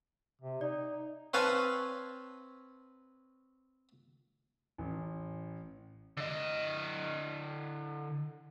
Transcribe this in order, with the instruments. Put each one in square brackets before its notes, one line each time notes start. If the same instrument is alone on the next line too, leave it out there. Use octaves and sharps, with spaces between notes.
[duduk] C3
[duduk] D#4 [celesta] D5
[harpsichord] C4 B4 C#5 F5 G#5 A5
[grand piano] A1
[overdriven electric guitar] D3 D#5